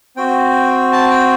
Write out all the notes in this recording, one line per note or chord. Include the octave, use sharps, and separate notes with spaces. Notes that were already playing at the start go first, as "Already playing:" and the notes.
C4 F#4 G5
A5
G5